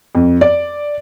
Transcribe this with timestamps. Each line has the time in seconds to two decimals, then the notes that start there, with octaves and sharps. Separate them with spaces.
0.15 F2
0.41 D5